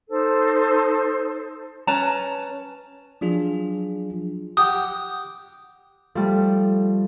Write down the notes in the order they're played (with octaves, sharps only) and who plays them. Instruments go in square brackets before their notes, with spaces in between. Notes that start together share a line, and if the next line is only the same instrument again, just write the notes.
[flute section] D#4 A4 C5
[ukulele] C#4 B4 A5 A#5
[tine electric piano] F3 F#3 D4 F4 G#4
[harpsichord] G4 F#5 G5 [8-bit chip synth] D#6
[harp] F3 G3 [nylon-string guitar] A3